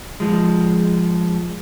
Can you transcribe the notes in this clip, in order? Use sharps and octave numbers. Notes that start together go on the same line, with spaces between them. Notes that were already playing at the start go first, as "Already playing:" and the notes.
F3 G#3